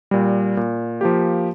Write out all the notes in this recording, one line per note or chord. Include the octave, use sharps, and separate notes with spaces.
A#2 G3
A#2
F3 A#3 G4